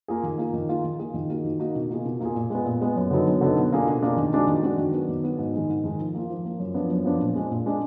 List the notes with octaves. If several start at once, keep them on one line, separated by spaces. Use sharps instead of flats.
A#3 F4 G#4
D#3
A#3 F4 G#4
D#3
A#3 F4 G#4
D#3
A#3 F4 G#4
D#3
A#3 D#4 F#4
D#3
A#3 D#4 F#4
B2
A#3 F4 G#4
B2
A#3 F4 G#4
A#2
G#3 B3
A#2
G#3 B3
F#2
D3 F#3 B3 D#4
F#2
D3 F#3 B3 D#4
B2
A#3 D4 F4 G#4
B2
A#3 D4 F4 G#4
D#3
G#3 D4 F#4
D#3
G#3 D4 F#4
D#3
F#3 B3
D#3
F#3 B3
G#2
D#3 G#3 D#4
G#2
D#3 G#3 D#4
F3
A#3 F4
F3
A#3 F4
F#2
F3 B3 D4
F#2
F3 B3 D4
A#2
G#3 D4
A#2
G#3 D4